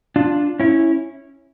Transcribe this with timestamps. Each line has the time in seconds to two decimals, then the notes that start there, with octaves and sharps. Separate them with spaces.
0.16 D4 F4
0.60 C#4 E4